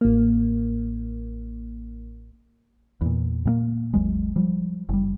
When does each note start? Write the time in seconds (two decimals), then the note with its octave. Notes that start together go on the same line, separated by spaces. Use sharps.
0.01 A1 A#3
3.01 E2 A#2
3.45 A#2 G#3 A#3
3.94 G#1 D#2 F#3 G#3
4.36 F3 G3
4.89 F#1 G3